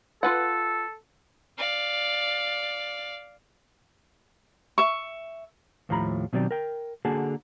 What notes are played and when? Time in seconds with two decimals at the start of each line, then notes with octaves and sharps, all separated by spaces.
0.23 F4 A4 B4 F#5
1.58 D5 F5
4.78 E5 C#6
5.89 D#2 A2 F3 A#5 B5
6.33 B2 D#3 F#3 C4 G4 D5
6.51 A#4 G5
7.05 D3 A#3 F#4 G#4 A5